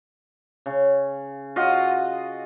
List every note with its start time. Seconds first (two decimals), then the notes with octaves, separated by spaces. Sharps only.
0.66 C#3
1.56 F4 F#4 D#5